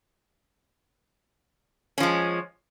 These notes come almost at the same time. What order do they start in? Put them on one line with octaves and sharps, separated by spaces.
C#4 F3 G#3